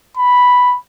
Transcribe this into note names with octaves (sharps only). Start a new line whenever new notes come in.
B5